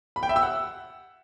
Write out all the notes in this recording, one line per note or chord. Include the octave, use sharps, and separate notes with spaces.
B5
G5
E5
E6
F#5